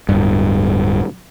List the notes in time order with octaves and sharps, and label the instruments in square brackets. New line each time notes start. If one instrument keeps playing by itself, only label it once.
[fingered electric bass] D1 G2